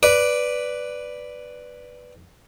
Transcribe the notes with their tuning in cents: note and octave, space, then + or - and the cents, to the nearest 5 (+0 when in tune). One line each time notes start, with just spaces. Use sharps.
B4 +0 D5 +0